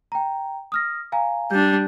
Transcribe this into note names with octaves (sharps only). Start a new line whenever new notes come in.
G5 A#5
D#6 F6 A#6
F5 G#5 A#5
G3 D4 G6